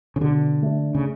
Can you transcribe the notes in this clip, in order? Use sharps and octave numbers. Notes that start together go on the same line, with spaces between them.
C#3
B2 D3
A3 D4
C#3